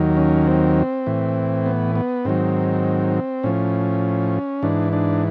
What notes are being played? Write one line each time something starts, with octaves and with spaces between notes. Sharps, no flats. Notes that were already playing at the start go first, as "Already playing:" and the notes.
Already playing: D#2 D#3 F#3
C#4
C4
A2 E3
B3
B3
G#2 D#3 F#3 C4
A2 F3 C#4
G#2 E3 D4
D4